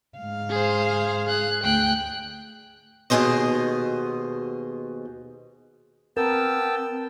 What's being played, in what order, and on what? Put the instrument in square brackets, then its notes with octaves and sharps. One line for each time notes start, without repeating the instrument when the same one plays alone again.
[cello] G#2 F5
[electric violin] G#4 C5
G#4 F#6
[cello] D2 [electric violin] G5 F#6
[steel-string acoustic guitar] D#2 B2 D#3 G#4 C5 D#5
[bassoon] B3 [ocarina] C4 [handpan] A#4 [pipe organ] G5 A5 E6